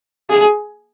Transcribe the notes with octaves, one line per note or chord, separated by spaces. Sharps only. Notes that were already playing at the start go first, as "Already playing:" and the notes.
G#4